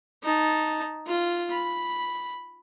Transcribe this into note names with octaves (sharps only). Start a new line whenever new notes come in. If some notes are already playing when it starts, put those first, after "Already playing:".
D#4 A5
F4
B5